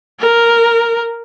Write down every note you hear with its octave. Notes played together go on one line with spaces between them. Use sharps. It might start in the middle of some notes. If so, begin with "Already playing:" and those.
A#4